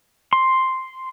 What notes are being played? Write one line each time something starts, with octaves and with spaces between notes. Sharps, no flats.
C6